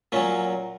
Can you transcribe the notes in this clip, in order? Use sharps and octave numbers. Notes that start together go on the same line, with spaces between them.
A#2 F#3 C#4